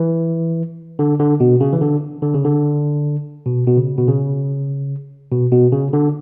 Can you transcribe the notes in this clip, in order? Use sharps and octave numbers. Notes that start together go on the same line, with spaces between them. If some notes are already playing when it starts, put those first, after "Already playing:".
Already playing: E3
D3
D3
B2
C#3
E3
D3
D3
C#3
D3
B2
B2
C#3
B2
C#3
B2
B2
C#3
D3